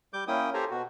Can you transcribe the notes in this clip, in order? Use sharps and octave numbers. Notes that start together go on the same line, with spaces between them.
G3 D6 G6
A#3 C#4 E4 G5 D#6
G4 A4 C5 G#5 A#5
B2 F#4